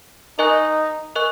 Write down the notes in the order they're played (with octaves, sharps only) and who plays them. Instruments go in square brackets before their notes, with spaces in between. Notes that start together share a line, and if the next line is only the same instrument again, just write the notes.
[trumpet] D#4 [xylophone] A#4 D#5 G#5 C#6 F#6
[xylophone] A#4 D#5 G#5 C#6 F#6